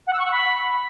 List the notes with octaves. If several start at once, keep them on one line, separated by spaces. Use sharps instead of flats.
F#5
E6
C#6
F#5
B5